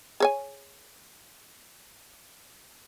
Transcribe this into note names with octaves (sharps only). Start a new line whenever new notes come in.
G#4 C#5 G#5